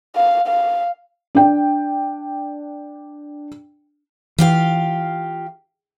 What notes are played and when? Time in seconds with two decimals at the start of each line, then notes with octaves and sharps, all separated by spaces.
0.16 F5
0.47 F5
1.35 D4 G5
4.38 E3 F4 G4 F5